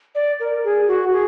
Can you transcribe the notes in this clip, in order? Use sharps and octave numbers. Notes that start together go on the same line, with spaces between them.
D5
A#4
G#4
F#4
G#4